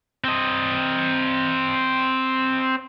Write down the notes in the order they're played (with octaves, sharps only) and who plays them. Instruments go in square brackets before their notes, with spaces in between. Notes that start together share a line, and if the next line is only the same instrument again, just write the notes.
[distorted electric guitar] C4 D#5